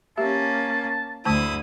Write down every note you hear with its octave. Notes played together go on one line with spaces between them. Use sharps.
A#3 C#4 G4 E5 A5
D2 D3 A3 E4 A5 D#6